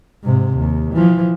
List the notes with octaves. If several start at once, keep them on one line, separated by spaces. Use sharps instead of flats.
G#2 C3
D#2
E3 F3